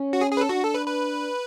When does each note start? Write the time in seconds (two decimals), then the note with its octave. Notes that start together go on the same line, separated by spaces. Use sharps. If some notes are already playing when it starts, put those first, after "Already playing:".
Already playing: C#4
0.13 F#4
0.21 G#4
0.31 G#4
0.37 B4
0.41 A4
0.49 D4 F#4
0.63 A4
0.74 B4
0.87 B4